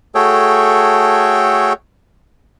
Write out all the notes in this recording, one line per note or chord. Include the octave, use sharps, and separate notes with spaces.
A3 F#4 G#4 A4 C#5 G5